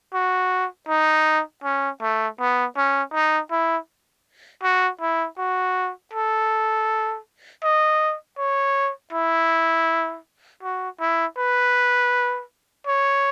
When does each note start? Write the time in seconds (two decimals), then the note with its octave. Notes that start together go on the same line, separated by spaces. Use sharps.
0.14 F#4
0.88 D#4
1.63 C#4
2.02 A3
2.39 B3
2.77 C#4
3.14 D#4
3.51 E4
4.63 F#4
5.01 E4
5.38 F#4
6.13 A4
7.63 D#5
8.38 C#5
9.13 E4
10.63 F#4
11.00 E4
11.38 B4
12.87 C#5